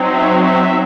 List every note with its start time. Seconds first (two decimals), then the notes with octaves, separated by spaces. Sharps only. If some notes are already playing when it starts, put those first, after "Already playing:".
Already playing: F#3 C4 D#4
0.13 E5
0.44 E5